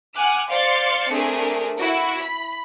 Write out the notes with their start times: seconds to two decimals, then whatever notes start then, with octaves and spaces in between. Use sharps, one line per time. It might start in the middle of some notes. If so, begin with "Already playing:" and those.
0.15 F#5 G#5 D6 F6 F#6
0.51 C5 D5 F5 C6 A6 C#7
1.12 A3 C4 D4 G#4 A#4
1.79 E4 F#4
2.20 B5